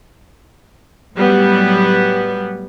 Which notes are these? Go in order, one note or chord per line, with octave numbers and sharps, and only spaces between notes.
A2 F#3 G3 B3